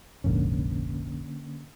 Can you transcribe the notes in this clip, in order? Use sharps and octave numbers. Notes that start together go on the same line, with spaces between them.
F1 A#1 G#2 D3 A#3 C#4